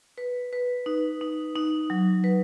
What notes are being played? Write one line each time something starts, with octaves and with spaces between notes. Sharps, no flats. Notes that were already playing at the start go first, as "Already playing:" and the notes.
B4
B4
D#4
D#4
D#4
F#3
B4